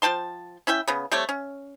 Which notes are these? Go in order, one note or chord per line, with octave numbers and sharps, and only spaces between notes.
F3 G5 A5 C6
C#4 E4 E5 G5
C#3 B3
G3 A3 C4 C#5
C#4